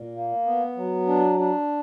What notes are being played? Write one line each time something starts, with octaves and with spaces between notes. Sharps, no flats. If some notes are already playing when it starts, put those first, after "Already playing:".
Already playing: A#2
A#3
B3
F#3
D4
D4